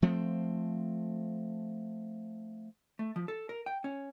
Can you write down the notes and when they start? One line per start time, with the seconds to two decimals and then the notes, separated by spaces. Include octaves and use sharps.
0.02 F3 A3 C4
2.99 A3
3.16 F3
3.28 A4
3.49 A#4
3.66 G5
3.84 C#4